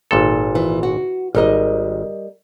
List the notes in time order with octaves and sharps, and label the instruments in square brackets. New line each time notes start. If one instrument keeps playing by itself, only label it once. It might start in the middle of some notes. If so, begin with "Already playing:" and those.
[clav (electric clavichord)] G#1 A#2 A4
[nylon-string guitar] E3
F#4
[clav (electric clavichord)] G#1 [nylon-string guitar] G3 A#4 D#5